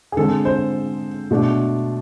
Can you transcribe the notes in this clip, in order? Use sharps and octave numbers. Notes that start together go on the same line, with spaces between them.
G#4
D3 G#3 C4 A4
C5
B2 A3 D4